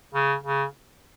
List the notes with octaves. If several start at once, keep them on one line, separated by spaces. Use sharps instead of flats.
C#3
C#3